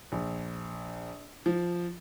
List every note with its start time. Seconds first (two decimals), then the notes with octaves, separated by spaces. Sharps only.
0.12 A#1
1.46 F3